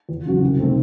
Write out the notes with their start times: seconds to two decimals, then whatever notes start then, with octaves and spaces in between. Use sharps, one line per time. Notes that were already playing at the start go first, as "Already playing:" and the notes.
0.09 E2
0.25 C#3 F#3 C#4 F#4
0.42 C2
0.59 C3 D#3 A3 C4